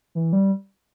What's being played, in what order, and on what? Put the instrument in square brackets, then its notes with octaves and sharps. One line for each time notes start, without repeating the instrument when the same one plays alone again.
[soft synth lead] E3
G3